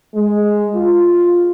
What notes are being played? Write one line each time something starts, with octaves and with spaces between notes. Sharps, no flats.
G#3
F4